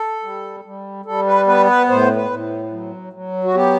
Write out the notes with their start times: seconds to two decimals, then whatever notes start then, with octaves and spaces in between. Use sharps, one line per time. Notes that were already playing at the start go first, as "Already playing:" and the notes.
Already playing: A4
0.23 G3
0.65 G3
1.05 G3 A4
1.27 B4
1.47 B3 B4
1.68 B4
1.89 A2 C5
2.16 B4
2.30 A2
2.72 F#3
3.13 F#3
3.44 F#4
3.54 B3 G4